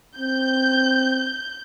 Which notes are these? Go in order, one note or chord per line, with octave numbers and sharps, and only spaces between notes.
C4 G6